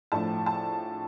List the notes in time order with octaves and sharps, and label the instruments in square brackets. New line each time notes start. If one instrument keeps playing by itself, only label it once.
[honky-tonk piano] A2 F3 A3 D4 A5
A5